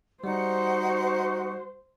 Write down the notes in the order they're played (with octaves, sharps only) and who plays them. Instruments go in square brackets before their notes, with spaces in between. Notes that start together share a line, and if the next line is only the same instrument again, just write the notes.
[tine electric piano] G3 [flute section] D#4 F#5 [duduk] F#4 [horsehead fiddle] C5